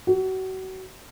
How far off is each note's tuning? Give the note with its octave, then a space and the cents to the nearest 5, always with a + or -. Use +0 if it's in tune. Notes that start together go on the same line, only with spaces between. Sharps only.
F#4 +30